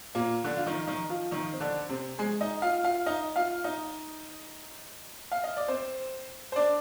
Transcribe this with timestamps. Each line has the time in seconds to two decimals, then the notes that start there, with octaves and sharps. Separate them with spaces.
0.15 A#2 A#3
0.44 D3 D4
0.57 F4
0.66 D#3 D#4
0.87 D#3 D#4
1.09 F3 F4
1.31 D#3 D#4
1.52 C4
1.60 D3 D4
1.89 C3 C4
2.19 G#3 G#4
2.41 D#4 D#5
2.62 F4 F5
2.84 F4 F5
3.06 D#4 D#5
3.36 F4 F5
3.64 D#4 D#5
5.32 F5
5.44 D#5
5.57 D5
5.68 C4 C5
6.52 C5
6.56 D4 D5